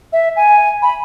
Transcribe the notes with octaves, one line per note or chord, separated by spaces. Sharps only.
E5
G#5
B5